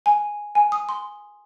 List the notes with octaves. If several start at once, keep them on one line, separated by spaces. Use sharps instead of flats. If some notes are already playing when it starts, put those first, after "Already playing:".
G#5
G#5
D#6
C6